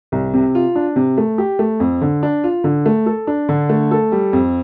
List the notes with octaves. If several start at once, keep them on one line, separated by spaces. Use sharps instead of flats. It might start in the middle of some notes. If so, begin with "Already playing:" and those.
C2
C3
F4
D4
C3
A3
G4
A3
F2
D3
D4
F4
D3
A3
A4
D4
D3
A3
A4
G3
F2